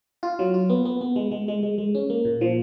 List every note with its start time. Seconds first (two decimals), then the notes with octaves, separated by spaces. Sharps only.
0.23 F4
0.39 F#3
0.54 F4
0.70 B3
0.85 B3
1.01 B3
1.16 G#3
1.31 G#3
1.48 G#3
1.63 G#3
1.78 G#3
1.95 C#4
2.10 A#3
2.25 A#2
2.41 F3